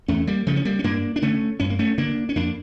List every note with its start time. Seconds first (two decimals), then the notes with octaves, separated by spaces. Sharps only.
0.08 E2 A3 C#4
0.27 G3 A#3
0.47 C#3 F3 A3
0.56 C#4
0.65 G3 A#3
0.79 C#4
0.84 G2 A#3 D4
1.16 D4
1.22 D3 A3 C#4
1.60 G2 C#4
1.70 A#3
1.79 A3 C#4
1.98 D3 A#3 D4
2.29 C#4
2.36 F2 A#3 D4